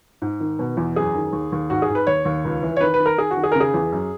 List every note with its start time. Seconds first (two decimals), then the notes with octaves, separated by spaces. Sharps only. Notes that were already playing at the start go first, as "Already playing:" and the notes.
0.22 G#2
0.40 D#3
0.59 B2
0.77 E2
0.96 F#2 G#4
1.15 D#3
1.33 D#2
1.52 D#2
1.70 G#2 F#4
1.82 G#4
1.89 G#2
1.95 B4
2.07 D#2 C#5
2.25 D#2
2.45 C#2
2.63 E3
2.77 C#5
2.81 D#3 B4
2.94 B4
3.00 D#3
3.06 A#4
3.18 D#3 G#4
3.31 F#4
3.37 D#3
3.44 G#4
3.52 C#3 A#4
3.60 G#4
3.74 E2
3.92 F#2